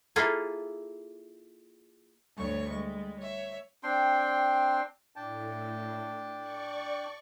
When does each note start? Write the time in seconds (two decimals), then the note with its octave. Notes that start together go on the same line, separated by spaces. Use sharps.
0.16 A#3 E4 F4 G#4 A4
2.36 D2 G2 C#5 C#6
2.70 G3 G#3
3.21 C#5 E5
3.83 C4 D4 G5 C6
5.16 A2 D4 G5 A5
6.37 D5 C#6